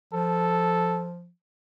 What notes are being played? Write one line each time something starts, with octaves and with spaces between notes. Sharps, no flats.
F3 A4